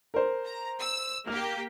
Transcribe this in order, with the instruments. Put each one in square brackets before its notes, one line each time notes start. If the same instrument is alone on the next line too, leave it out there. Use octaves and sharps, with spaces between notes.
[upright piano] A#4 C5
[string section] A#5
E6
[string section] A#3 G4 [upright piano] F6